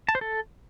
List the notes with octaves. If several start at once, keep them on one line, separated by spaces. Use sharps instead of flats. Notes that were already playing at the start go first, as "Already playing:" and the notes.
A5
C5
A4